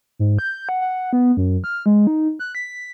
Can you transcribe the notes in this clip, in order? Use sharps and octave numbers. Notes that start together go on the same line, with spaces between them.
G#2
G6
F#5
F#5
B3
F#2
F6
G#3
D#4
F#6
B6